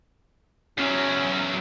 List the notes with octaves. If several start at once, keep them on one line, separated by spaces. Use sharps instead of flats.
E2 F#3 C#4